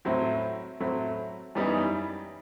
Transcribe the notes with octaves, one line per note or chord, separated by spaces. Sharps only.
A2 F#3 A3 C4 E4
A2 F#3 A3 C4 E4
F#2 E3 G3 B3 D#4